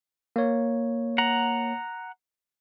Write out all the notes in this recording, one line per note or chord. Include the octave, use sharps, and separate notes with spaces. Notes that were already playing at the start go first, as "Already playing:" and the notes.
A#3 C#5
F#5 A#5